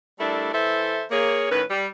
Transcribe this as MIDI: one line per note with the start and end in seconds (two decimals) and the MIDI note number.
0.20 0.52 55
0.20 0.52 57
0.20 0.52 62
0.20 0.52 64
0.20 0.52 69
0.20 0.52 70
0.53 1.03 52
0.53 1.03 69
0.53 1.03 72
0.53 1.03 76
1.11 1.50 58
1.11 1.50 68
1.11 1.50 73
1.51 1.62 45
1.51 1.62 51
1.51 1.62 61
1.51 1.62 71
1.70 1.86 55